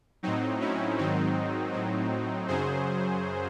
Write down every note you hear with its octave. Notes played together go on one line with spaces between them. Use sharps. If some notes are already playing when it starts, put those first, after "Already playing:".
A2 F#3 C4 D#4
C#4 E4
G#2 D#3 F#3 C4 D#4
A2 F#3
F#2 C#3 F#3 G#4 C5